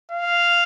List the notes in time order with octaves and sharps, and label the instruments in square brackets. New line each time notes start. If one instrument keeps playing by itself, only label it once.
[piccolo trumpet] F5